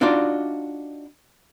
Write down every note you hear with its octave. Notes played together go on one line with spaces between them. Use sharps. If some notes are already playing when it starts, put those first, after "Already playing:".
D4 D#4 F4 F#4 D5